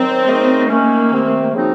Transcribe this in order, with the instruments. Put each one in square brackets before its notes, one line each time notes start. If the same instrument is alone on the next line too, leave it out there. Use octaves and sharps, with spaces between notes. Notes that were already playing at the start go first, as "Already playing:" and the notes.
Already playing: [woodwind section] D#3 F#3 [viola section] C4
[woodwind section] C#3 A3 D#4 A#4 D#5
[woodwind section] D#3 A3 C#4 [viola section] A#3
[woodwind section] C3 D#3 A3 C4
C#3 F3 C4 D#4 F#4